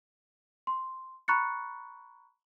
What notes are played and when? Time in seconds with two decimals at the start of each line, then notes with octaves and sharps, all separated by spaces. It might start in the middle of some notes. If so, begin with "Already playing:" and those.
0.67 C6
1.28 A#5 B5 C#6 F#6 A6 C#7